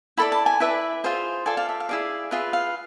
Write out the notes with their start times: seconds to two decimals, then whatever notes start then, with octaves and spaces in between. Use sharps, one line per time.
0.17 E4 A4 D5 B5
0.32 A5
0.46 G#5
0.60 E4 B4 D5 E5
1.04 F4 G#4 C5
1.46 F4 A4 D5 G#5
1.57 F5
1.69 E5
1.80 F5
1.89 E4 G#4 D5
2.31 F4 G#4 B4 E5
2.53 F5